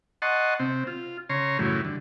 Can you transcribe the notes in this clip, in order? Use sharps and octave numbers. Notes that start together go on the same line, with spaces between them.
D#5 F#5 A5 C6 C#6
C3 C4
F4
C#3 C#5 A#5 C6
F#2 A2 C#3 E3 G3
D3